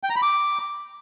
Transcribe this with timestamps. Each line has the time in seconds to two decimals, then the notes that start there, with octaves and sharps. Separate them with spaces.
0.03 G5
0.10 A#5
0.16 B5
0.22 D6